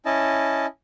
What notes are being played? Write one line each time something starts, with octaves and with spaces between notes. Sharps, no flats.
C#4 E4 D#5 A5